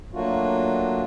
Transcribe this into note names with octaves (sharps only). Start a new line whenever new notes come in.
F#3 A3 A#3 D4 F4 F#4